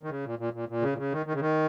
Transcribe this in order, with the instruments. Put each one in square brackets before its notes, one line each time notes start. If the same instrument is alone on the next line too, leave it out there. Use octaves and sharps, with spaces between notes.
[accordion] D#3
C#3
A#2
A#2
A#2
A#2
C#3
A#2
C#3
D#3
D#3
C#3
D#3